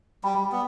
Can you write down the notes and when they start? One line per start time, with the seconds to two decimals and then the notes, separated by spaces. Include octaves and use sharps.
0.24 G3 G5 B5
0.52 B3